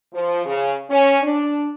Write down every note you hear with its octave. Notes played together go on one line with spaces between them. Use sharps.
F3
C#3
C#4
D4